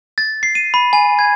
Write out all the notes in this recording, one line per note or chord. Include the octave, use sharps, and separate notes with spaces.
A6
C7
D#7
B5
G#5
G#6